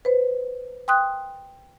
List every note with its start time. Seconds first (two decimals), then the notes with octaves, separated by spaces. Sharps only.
0.05 B4 C5
0.88 G5 C6 D#6 F#6